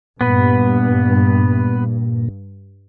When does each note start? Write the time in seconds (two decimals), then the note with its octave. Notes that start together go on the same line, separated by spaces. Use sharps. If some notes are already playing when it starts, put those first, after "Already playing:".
0.21 G2 A#2 B3 B4